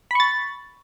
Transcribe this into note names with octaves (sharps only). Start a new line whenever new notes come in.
B5 C#6 A6